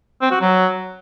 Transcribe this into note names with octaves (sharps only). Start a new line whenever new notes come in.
C4
F#4
F#3